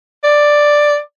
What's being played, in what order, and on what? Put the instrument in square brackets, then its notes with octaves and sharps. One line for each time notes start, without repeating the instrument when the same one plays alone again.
[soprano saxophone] D5